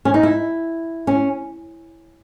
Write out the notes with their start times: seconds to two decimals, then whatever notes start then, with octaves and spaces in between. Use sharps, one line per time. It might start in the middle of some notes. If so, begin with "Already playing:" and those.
0.05 C#4
0.14 D#4
0.23 E4
1.07 C#4